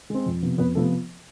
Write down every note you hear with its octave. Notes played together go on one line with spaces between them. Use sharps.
G#3 C4
F2
C3 F3 B3
F2 B3 B4
C3 F3 A3 B3 A4